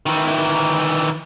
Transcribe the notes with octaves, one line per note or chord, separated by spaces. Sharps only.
D#3 E3